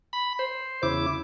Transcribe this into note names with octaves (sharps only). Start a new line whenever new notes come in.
B5
C5
E2 C#3 E4 D6